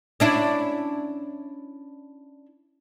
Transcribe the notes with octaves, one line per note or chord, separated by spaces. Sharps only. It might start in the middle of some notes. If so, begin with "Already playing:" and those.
C#4 D4 E4